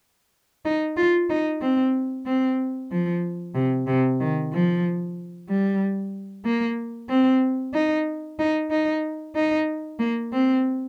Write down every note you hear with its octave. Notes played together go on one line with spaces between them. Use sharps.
D#4
F4
D#4
C4
C4
F3
C3
C3
D#3
F3
G3
A#3
C4
D#4
D#4
D#4
D#4
A#3
C4